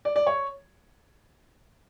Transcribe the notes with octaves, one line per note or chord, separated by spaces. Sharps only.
D5
D5
C#5